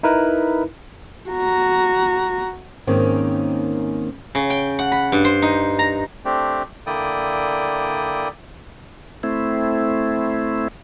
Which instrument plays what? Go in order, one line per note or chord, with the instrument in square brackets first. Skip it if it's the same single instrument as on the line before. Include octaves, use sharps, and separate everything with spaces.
[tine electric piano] D#4 E4 A#4 B4
[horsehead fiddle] F#4 A#5
[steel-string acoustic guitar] G#2 D#3 A#3 C4 C#4
[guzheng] C#3
G5
F#5
B5
G2
C5
D#4
A#5
[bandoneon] A3 C4 D4 G4
D3 A#3 E4 D5 G5 D#6
[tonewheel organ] A3 C4 E4